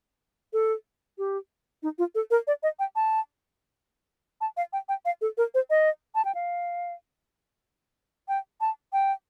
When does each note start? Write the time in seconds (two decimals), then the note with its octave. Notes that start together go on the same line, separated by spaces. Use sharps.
0.53 A4
1.18 G4
1.83 D#4
1.98 F4
2.15 A4
2.31 A#4
2.47 D5
2.63 D#5
2.79 G5
2.96 A5
4.41 A5
4.57 F5
4.73 G5
4.89 G5
5.05 F5
5.21 A4
5.38 A#4
5.54 C5
5.70 D#5
6.15 A5
6.25 G5
6.35 F5
8.28 G5
8.61 A5
8.93 G5